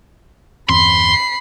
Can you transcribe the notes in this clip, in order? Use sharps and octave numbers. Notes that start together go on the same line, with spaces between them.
G1 E2 C4 B5 C6 C7